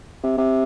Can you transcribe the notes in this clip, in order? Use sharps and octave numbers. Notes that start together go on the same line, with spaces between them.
C3
C3